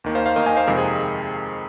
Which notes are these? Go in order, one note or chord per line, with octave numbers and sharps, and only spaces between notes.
D#2 D#3 A#3
C5 F5
C5 F5
D#2 D#3 A#3 A#4 D#5
D#5 G#5
C5 F5
F2 C3 D#3 G#3 A#4
G#4 C5